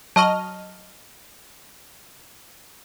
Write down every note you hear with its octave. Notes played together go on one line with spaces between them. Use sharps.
F#3 D#5 A5 C#6 F6